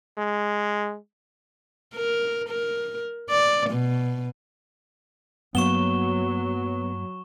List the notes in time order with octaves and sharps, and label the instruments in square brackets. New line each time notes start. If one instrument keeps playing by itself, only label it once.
[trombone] G#3
[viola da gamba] A#4
A#4
D5
B2
[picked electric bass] G2 A#3 [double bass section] F#3 [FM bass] B3 [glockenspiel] C#6 E7 G7